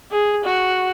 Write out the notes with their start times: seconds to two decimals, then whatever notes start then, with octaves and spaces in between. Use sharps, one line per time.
0.11 G#4
0.44 F#4